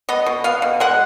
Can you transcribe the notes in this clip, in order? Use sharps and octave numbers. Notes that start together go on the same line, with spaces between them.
B3 D#5
B2
B3 F5
B2
G#3 F#5